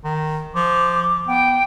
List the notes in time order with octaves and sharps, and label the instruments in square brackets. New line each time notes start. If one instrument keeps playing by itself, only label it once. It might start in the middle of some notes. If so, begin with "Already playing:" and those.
[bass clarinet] D#3
[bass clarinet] F3 [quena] D6
[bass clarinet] B3 [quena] G5